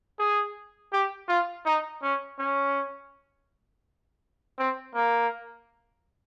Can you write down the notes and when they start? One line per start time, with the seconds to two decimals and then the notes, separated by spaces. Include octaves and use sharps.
0.19 G#4
0.93 G4
1.29 F4
1.66 D#4
2.03 C#4
2.39 C#4
4.59 C4
4.95 A#3